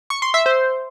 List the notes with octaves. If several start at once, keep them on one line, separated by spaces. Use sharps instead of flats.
C#6
C6
E5
C5